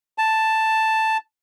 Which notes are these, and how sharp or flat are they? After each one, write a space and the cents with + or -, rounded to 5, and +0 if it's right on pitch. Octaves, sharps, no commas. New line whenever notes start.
A5 +5